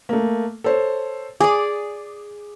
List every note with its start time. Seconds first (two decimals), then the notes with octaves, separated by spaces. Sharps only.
0.09 A3 A#3
0.64 A4 C5 C#5
1.41 G#4 D5 D6